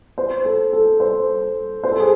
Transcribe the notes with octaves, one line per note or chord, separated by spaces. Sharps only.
C5
A4
A4
C5
C5
A4
G#4